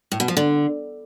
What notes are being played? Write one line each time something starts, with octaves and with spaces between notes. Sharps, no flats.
A2
B2
F3
D3